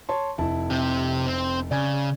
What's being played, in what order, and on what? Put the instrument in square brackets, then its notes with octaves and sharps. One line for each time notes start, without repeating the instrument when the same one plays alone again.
[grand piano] C#5 A5 C6
F1 E4 A5
[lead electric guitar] C3 G4
C4
[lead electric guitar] C#3 [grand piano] D5 G#5 G#6